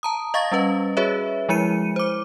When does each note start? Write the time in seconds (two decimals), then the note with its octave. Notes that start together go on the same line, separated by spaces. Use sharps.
0.03 A5 A#5 D#6
0.34 D#5 F5 C#6 A6 A#6
0.52 G3 C#4 B4 D#5
0.97 F#4 G#4 B4 C#5 E5
1.49 F3 G#3 E4 C#7 D#7
1.96 C5 D6